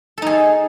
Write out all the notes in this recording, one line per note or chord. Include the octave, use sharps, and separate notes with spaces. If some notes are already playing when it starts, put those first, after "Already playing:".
D#4 G#4 A4